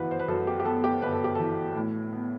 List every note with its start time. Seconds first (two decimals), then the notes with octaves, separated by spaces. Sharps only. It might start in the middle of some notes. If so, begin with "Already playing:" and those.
Already playing: G1 F#2 E3 B4 F#5
0.11 C5
0.19 B4
0.28 F#2 A4
0.47 G4
0.60 G4
0.65 B3 A4
0.84 G4
1.02 G1 B4
1.12 A4
1.24 G4
1.35 E3 A4
1.75 A2
2.13 B3